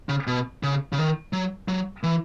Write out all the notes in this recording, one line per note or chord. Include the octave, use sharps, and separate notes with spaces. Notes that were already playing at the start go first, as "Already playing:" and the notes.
C#3
B2
C#3
C#3
D#3
F#3
F#3
E3